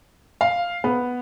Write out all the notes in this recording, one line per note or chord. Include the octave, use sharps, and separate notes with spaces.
F5
B3